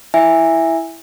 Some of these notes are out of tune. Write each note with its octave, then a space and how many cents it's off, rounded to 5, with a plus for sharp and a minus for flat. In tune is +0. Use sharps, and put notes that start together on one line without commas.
E4 +0 E5 +0 G#5 -20